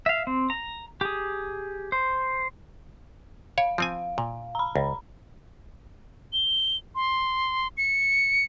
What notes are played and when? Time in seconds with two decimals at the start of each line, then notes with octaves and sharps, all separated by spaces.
0.06 E5 F5
0.27 C4
0.50 A#5
1.01 G4 G#4
1.92 C5
3.58 C#5 F5
3.78 F3 C4 G#5
4.18 A#2
4.55 A#5 B5
4.76 C#2
6.33 G7
6.95 C6
7.77 C#7